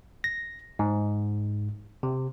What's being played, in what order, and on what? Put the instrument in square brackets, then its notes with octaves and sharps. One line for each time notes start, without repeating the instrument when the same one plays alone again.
[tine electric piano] A#6
G#2
C3